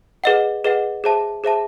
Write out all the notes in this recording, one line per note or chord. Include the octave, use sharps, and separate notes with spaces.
G#4 B4 D#5 F#5
G#4 B4 D#5 F#5
G#4 C5 E5 A5
G#4 C5 E5 A5